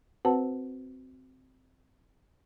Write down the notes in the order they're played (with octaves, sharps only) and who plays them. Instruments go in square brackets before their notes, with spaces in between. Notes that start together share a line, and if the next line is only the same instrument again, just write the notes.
[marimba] C4 F#4 B4 C5 F#5 A5